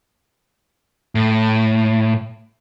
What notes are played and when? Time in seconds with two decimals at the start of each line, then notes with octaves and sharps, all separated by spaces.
1.15 A2